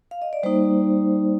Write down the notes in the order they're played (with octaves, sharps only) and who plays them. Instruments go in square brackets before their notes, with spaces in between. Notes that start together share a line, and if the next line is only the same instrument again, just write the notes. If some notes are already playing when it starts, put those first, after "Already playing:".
[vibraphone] F5
D#5
D5
G3 A#3 D#4 C5